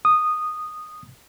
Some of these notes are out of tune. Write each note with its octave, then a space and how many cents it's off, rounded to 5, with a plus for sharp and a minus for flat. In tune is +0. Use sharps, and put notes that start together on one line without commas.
D#6 -10